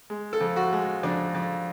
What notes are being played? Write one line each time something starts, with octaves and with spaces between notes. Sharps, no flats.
G#3
A4
F2
F#4
G#3
F2 D4
F2